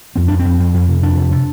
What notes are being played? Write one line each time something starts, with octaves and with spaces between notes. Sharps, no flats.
F2 C4
F2 D4
C4
F2
F2
F2
C3
F2 D4
C3
C3